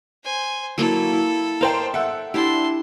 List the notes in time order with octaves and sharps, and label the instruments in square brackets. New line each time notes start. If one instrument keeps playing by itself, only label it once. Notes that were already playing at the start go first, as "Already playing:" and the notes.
[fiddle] C5 G#5
[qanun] F#3 A#3 E4 [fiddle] A4
[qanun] E4
[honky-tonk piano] A#4 C5 G5 [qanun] D5 D#5 F5
[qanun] A4 [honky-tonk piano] E5 F#5
[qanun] D4 E4 G4 [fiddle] A5 C6